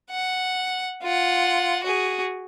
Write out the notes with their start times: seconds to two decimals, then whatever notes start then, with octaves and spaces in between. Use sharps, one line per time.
0.10 F#5
1.03 F4 F#5
1.84 F#4 G#4